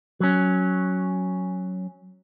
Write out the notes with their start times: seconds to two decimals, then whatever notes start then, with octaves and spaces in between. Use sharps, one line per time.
0.20 F#3 C#4